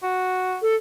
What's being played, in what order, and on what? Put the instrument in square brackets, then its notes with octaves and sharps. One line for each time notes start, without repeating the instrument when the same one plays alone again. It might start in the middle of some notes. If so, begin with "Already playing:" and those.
[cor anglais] F#4
[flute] A4